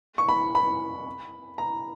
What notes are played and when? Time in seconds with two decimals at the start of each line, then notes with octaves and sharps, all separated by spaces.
0.18 C#6
0.29 B5
0.55 B5
1.58 A#5